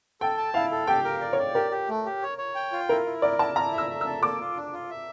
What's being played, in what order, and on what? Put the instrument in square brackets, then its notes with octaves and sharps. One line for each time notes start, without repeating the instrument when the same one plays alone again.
[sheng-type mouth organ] A4 [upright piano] G5
[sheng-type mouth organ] A5
[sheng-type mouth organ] E4 [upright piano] F5
[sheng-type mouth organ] A4
[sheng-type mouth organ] G4 [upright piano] G5
[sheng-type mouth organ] A#4
D5
[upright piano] C#5
[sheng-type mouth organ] D5
[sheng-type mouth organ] G4 [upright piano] A#4
[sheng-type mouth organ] G4
A3
G4
C#5
C#5
G5
F4
[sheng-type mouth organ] E4 [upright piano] A#4
[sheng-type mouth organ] E4
[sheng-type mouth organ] A#4 [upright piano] D5
[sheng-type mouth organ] E4 [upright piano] A5
[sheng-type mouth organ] E4 [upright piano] A#5
[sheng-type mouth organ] E5
[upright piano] E6
[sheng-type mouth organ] E5
[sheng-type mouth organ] A4 [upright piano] E6
[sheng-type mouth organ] A#3 [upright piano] D6
[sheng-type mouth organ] F4
D4
F4
E5